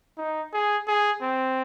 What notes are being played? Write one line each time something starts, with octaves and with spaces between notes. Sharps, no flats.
D#4
G#4
G#4
C4